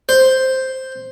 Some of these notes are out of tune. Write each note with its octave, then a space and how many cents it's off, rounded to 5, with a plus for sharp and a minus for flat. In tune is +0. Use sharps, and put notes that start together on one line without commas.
C5 +0